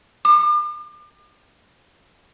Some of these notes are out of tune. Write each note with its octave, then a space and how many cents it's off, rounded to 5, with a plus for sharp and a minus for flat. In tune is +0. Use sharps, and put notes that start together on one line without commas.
D6 +40